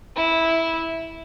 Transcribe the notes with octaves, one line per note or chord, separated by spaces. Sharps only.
E4